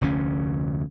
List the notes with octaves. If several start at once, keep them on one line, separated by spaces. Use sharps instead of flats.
F1 D2 D3 C#4